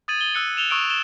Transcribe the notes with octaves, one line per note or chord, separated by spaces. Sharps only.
D#6 G#6 A6 D#7 F#7
G7
E6 F#6 C#7
E7 F7 G7
C#6 D#6 E6 F#6 D7 G7
E7 G7